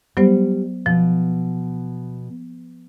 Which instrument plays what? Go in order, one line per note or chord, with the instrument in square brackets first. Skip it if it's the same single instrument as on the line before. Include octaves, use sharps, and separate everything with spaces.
[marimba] F#3 B3 C5 [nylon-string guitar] G3
[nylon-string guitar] B2 [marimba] F3